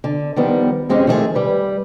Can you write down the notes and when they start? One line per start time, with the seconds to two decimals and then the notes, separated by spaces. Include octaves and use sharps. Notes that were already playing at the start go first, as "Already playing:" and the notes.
0.04 D3
0.36 D#3 F3 G3 B3
0.89 F2 G#3 C4 C#4 G4
1.07 D#3 F3 A3 D4 G#4 A#4
1.35 G3 B4